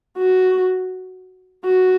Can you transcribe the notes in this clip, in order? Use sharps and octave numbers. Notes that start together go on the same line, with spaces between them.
F#4
F#4